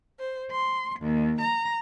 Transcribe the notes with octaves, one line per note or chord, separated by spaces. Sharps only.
C5
C6
D#2
A#5